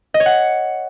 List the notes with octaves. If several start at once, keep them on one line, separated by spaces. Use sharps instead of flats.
D#5
C#5
F#5